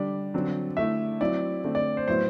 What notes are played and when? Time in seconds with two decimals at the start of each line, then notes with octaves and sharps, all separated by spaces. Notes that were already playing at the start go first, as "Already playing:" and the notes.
Already playing: D3 G3 D4 D5
0.34 D3 F#3 C4
0.77 D3 A3 E4 E5
1.20 F#3 C4 E4 D5
1.64 D3 A3 C4
1.75 D5
1.97 C5
2.08 A2 F#3 B3 E4 C5